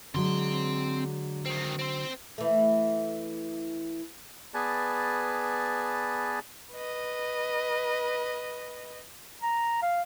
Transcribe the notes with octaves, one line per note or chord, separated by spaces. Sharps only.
D3 F#3 G#3 C4 C6
D#3 C4
C4 C5
E3 A3
B3 G#4 B4 D5 G#5 A5
B4 D#5
A#5
F5